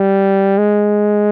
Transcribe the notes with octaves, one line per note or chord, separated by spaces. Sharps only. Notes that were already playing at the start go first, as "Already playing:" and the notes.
Already playing: G3
G#3